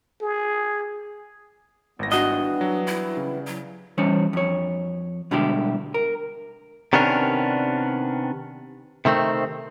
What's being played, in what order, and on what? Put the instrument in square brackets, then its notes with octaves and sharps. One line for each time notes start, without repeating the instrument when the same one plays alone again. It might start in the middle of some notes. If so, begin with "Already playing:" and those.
[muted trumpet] G#4
[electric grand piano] G#1 A#6 [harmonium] E3 G3 B3
[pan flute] D4 [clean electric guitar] F#4 D#5
[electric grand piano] F#3
[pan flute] E4
[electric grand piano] C#3
[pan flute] F#3
[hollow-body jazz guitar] E3 G3 C#4 C5 C#5
F2 C#5
B2 D3 G3 G#3 E4 G4
A#4
[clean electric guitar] C3 D#3 B3 C#4 D4 A#4
C3 D#3 A3 C4